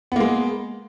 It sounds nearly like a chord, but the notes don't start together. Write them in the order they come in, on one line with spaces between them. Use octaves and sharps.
B3 A#3 G#3